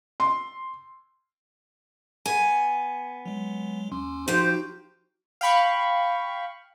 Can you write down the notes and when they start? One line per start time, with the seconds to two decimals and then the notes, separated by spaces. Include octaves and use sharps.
0.20 C6
2.26 B3 G#5
3.26 F#3 G#3
3.92 D#2 C#4 C6
4.28 F3 D#4 F#4 G4 C5
5.41 F5 G5 B5 C#6